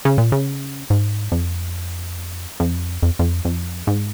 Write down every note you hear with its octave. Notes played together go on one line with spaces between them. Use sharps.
C#3
A#2
C#3
G#2
F2
F2
F2
F2
F2
G#2